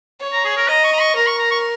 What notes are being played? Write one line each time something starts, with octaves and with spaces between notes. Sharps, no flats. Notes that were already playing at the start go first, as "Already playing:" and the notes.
C#5
A#5
G#4
A#4
D#5 A#5
C#6
A#5
C#6
A#4 A#5
C#6
A#5
C#6